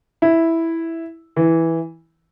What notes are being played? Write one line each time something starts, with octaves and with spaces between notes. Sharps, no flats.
E4
E3